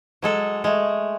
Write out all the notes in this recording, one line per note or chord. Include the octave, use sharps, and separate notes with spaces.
F#3 G#3 A4
G#3 A3